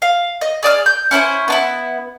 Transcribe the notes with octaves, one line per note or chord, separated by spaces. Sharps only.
F5
D#5
G#4 D5 D#6 F6
G6
C#4 E4 A4 C5
B3 D4 E4